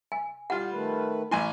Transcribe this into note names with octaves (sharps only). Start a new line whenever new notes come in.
G#5
G3 F4 F#5
D#3 A3 B4
A1 E4 G#5 C6